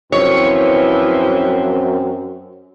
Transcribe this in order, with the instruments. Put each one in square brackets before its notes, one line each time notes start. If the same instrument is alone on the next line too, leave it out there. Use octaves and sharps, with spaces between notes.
[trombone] F#2 [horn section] E3 F3 [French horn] C4 [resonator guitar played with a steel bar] C#5